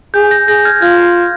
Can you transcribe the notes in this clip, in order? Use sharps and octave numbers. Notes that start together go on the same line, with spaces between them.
G#4 G6
G6 A#6
G#4 G6 A#6
F6 G#6
F4 F6 G#6